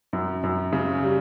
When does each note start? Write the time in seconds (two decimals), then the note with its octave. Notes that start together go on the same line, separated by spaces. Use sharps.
0.13 F#2
0.43 F#2
0.73 C#3
1.03 G3